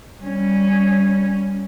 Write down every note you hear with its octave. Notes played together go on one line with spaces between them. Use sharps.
G3 C#4